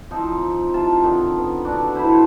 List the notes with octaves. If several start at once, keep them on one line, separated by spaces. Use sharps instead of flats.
F3 C4 D#4
C3 F4 A5
D3 D#3 D#4
B3
D4 F#4 A4
E4 C5 A5 B5